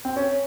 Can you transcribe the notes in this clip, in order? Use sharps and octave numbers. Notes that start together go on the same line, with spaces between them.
C4
C#4